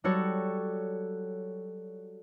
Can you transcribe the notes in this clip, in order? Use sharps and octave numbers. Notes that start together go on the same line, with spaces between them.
F#3 G3 F#4 A4 C#5